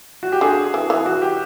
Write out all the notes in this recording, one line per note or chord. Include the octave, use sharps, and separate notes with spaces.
F#4
G4
D3 F#4 G#4
E3
E3
F#4
G4